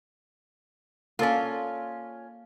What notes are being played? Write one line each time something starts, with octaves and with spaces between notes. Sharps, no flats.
A#3 C#4 F4 A4 D5